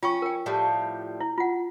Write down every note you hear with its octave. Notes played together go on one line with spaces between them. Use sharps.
C#4 F4 G5 C#6
A#4 G5
A2 F3 G3
E4
F4 F#5